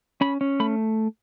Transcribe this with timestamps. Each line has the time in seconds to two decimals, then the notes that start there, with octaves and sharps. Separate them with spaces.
0.21 C#4 B5
0.41 C#4
0.60 A3 B5